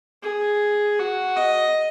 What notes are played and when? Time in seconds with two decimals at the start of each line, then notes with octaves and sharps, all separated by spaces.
0.22 G#4
0.99 F#4
1.36 D#5